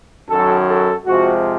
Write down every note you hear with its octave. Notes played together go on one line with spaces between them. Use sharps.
F#2 D#3 F#3 A4
A4
C3 F3 G#3 F#4